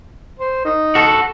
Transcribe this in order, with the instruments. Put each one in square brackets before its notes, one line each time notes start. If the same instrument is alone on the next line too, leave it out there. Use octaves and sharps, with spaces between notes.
[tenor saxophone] C5
D#4
[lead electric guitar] F#4 A4